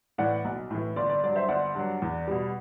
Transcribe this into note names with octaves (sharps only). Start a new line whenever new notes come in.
A2 E3 D5 F#5
B1
A2 E3
G1 D5
D5
G2 F#3 D5
C5 E5
G1 D5 F#5
G2 F#3
E2
B2 G3